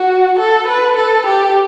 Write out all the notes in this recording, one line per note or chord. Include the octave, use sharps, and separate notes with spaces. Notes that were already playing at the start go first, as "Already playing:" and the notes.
Already playing: F#4
A4
B4
A4
G4